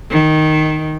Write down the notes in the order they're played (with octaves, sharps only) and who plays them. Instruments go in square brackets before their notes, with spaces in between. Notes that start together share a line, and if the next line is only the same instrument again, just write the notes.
[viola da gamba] D#3